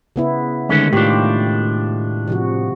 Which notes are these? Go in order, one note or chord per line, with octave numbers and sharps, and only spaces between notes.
C#3 B3 E4
D3 D#3 G#3 A3 C#4
A2 D4 F4 G4
C3 F3 F#4